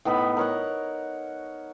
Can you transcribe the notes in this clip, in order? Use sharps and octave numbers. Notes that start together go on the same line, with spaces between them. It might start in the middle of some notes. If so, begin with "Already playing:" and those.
A2 B3 D#4 B5
A#4 C#5 F#5